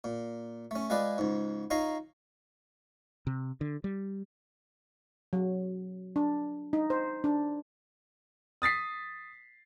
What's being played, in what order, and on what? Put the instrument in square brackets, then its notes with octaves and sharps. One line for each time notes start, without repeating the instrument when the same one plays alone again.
[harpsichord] A#2
A3 C#4
G#3 F4 G#4 B4 D5
C#2 G#2
D#4 F4 C#5 A#5 C6
[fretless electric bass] C3
D3
G3
[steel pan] F#3
D4
D#4
C5
D4
[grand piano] D#6 A6 B6 C7